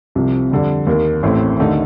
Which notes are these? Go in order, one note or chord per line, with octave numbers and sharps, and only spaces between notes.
C2 C3 F3
F2 D3 G3
D#2 D#3 A#3
A1 A2 A3 C4
D#2 D3 A3 D#4